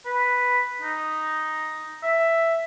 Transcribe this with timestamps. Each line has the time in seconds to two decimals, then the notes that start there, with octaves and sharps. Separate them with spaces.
0.06 B4
0.82 D#4
2.03 E5